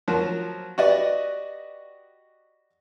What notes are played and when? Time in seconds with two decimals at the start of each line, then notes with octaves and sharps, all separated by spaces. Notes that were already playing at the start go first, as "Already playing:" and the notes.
0.08 F3 F#3 A#3
0.78 F#4 G4 B4 D5 D#5